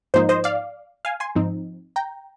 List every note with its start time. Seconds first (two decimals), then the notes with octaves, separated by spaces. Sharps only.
0.14 G#2 F3 A#3 D#4 C5
0.29 C5 D#5
0.44 D5 F5
1.05 F5 G#5
1.20 G#5 C6
1.35 G#2 F3 C4 D#4
1.96 G5 A#5